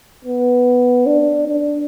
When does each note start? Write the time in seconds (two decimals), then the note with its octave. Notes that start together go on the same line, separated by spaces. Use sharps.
0.25 B3
1.07 D4
1.48 D4